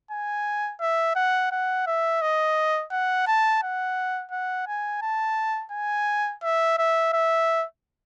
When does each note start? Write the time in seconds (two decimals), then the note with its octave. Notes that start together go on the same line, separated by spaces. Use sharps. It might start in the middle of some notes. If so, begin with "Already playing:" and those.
0.11 G#5
0.81 E5
1.16 F#5
1.52 F#5
1.87 E5
2.22 D#5
2.91 F#5
3.27 A5
3.62 F#5
4.31 F#5
4.67 G#5
5.02 A5
5.72 G#5
6.43 E5
6.78 E5
7.13 E5